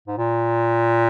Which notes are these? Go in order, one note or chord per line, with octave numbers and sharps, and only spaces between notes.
G#2
A#2